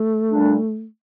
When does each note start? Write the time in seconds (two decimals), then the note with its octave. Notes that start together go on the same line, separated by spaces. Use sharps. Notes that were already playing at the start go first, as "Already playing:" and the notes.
Already playing: A3
0.30 A#2 G3 D4